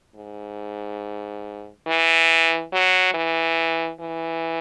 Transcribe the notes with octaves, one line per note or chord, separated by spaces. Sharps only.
G#2
E3
F#3
E3
E3